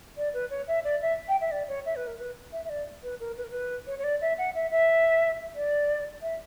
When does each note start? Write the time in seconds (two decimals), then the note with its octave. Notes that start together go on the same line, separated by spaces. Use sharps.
0.17 D5
0.34 B4
0.50 C#5
0.68 E5
0.84 D5
1.01 E5
1.29 G5
1.41 E5
1.51 D5
1.68 C#5
1.86 E5
1.96 B4
2.07 A#4
2.19 B4
2.52 E5
2.65 E5
2.69 D5
3.03 B4
3.20 A#4
3.37 B4
3.44 A#4
3.50 B4
3.87 C#5
3.99 C#5
4.04 D5
4.21 E5
4.38 F#5
4.55 E5
4.71 E5
5.55 D5
6.22 E5